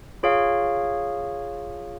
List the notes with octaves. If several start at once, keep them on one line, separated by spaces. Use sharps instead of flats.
F4 G#4 C#5 F5